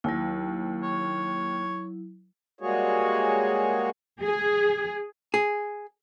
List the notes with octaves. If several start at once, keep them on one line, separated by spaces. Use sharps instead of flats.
D#2 F#3 E4
C#5
G3 G#3 A#3 F#4 G#4 C#5
G#4
G#4